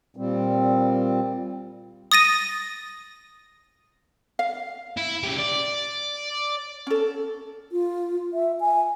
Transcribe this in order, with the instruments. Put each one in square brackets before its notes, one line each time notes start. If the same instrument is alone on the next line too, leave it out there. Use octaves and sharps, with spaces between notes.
[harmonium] A#2 G3 C4
[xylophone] D#6 A6 A#6 D#7
[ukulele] F5
[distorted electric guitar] E4
C#3 G4
D5
[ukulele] C#4 A4
[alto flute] F4
E5
G#5